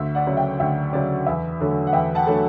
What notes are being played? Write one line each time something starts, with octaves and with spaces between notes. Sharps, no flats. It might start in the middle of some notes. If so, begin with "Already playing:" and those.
Already playing: D2 E5
D5 F#5
C#3 F#3
E5 G5
D2 E5
C#3 F#3 D5
E2 E5
D3 F#3 A3
F#5
E2 E5 G5
F#5 A5
D3 F#3 A3